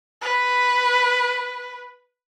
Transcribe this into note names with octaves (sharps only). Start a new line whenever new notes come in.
B4